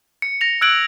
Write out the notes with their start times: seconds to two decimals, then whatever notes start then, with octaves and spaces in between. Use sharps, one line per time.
0.22 C#7
0.41 A#6 F7
0.61 E6 F#6 G#6 D7 F#7